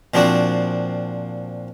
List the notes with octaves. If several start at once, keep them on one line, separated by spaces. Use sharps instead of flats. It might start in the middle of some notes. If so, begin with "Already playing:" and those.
A#2 F3 C4 D4 F#4